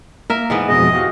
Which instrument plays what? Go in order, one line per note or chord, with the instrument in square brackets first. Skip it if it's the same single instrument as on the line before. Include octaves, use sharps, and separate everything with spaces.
[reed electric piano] A#3 [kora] A#4 E5
[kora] G#2 E3 B3
[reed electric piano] F2 B2 G#3 [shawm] D#5
[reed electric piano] F#4 G4 F5